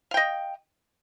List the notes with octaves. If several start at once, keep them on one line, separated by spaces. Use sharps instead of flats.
D#5 F5 G5